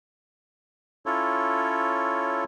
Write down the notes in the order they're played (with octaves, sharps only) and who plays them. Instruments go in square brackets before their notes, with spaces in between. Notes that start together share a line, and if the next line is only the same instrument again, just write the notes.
[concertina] C#4 E4 F4 A4 C#5